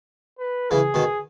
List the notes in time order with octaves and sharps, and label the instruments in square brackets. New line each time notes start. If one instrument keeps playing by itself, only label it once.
[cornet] B4
[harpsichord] C#3 E3 [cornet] G#4
[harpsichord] B2 D#3